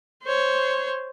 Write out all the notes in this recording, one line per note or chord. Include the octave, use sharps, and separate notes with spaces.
C5 C#5